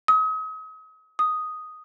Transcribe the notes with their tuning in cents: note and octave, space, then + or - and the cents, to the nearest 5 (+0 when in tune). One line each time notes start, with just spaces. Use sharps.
D#6 +40
D#6 +0